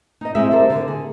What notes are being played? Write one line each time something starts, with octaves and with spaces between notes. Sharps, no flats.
D#4 D#5
G#3 C4 E4 G#4 E5
G4 A4 A#4 C5
D3
G#4